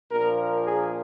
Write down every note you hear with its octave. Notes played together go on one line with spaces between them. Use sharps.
A#1 A#2 F3 A#3 A#4
G#4